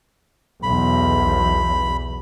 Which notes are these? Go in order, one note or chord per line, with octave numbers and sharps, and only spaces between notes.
B1 E2 B5